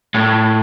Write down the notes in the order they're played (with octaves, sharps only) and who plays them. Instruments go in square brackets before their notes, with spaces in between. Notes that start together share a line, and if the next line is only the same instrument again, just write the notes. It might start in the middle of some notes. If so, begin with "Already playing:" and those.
[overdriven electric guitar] A2